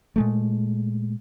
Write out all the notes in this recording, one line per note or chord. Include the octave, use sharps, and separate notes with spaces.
A#2 G#3 A3